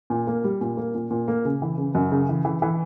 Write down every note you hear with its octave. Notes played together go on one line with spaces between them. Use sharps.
A#2
A#3
G3
A#2
A#3
A#2
A#2
A#3
C#3
E3
C#3
F#2
C#3
E3
E3
E3